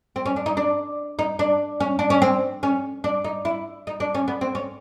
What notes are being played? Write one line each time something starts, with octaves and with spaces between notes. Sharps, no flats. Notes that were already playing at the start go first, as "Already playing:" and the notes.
C4
C#4
D4
D#4
D4
D#4
D4
C#4
D4
C#4
C4
C#4
D4
D#4
E4
D#4
D4
C#4
B3
C4
C#4